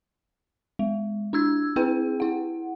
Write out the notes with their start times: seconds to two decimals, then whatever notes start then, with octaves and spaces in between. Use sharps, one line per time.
0.79 G#3
1.33 D4 E4 E6 G#6
1.76 C4 E4 G#4 B4 G5
2.20 E4 F#5